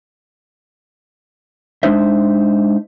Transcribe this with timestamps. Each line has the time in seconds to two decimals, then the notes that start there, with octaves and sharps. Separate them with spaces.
1.83 G#3 D4 D#4 C5 E5